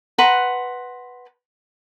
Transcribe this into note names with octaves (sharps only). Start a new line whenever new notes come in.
B4 F#5 A#5 C6